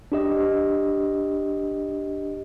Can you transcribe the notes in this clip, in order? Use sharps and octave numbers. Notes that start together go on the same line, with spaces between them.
D4 G4 D#5